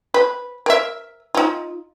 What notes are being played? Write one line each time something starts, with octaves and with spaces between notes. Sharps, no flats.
B4
A#4 E5
D#4 F4